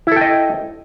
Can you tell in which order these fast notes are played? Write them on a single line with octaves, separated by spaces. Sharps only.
E4 A4 G5 D#5